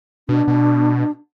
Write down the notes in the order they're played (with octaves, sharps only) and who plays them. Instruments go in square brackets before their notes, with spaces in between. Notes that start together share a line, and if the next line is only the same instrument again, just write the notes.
[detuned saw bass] B2 [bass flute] D4
[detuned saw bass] B2